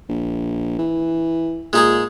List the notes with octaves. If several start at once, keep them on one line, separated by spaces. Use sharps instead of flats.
A#1
E3
A#2 G#3 D#4 G#4